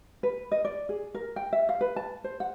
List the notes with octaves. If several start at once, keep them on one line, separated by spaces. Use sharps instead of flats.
B4
D#5
D5
G#4
A#4
G5
E5
F5
B4
A5
C5
F#5